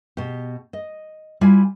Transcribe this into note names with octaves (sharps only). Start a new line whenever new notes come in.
B2 G4
D#5
G3 E4 F4 G#5